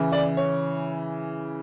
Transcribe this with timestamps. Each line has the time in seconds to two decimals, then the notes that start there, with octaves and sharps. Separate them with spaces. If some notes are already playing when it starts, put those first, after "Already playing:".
Already playing: C#3 E3
0.12 D5
0.37 C#5